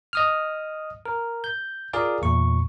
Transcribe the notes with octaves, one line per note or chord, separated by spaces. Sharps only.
D#5 D#6 F6
A#4
G6
F4 G#4 A#4 D5 F5
E2 A#2 C#6